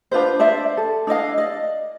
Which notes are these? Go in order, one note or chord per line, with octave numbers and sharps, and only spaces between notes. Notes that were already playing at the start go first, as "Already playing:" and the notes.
D4 F4 B4 C5
D4 C5 D5 E5
A4
D4 E4 D#5 F5
D5 D#5